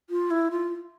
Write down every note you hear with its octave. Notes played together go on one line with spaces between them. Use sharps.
F4
E4
F4